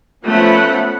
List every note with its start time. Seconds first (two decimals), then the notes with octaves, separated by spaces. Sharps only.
0.24 F3 A3 B3 C#4 F#5 B5